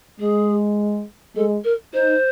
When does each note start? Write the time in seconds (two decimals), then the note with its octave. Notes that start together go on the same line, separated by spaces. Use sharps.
0.20 G#3 G#4
1.36 G#3 A4
1.64 A#4
1.94 D#4 C5